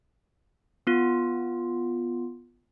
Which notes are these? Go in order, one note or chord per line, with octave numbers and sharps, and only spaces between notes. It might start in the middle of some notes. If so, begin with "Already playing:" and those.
B3 F4